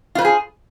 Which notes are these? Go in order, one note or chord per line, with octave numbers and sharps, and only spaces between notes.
F4 G#4 B4 C5